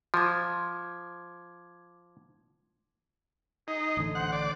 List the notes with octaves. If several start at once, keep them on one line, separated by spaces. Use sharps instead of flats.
F3 D6 G#6
D#4 G#4
A1 D3
C5 F#5
D5